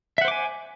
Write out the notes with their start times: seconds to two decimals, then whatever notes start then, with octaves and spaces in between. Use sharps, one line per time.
0.18 E5
0.21 F#5
0.25 C5
0.28 D6
0.31 G#5